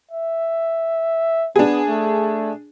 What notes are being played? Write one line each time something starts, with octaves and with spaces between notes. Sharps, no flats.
E5
B3 D4 G#4
A3